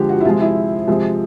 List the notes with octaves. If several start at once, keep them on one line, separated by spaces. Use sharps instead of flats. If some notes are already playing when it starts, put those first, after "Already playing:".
Already playing: D3 F3 G#3 G4
F#4
E4
C3 F3 G#3 F4
E4
C3 F3 G#3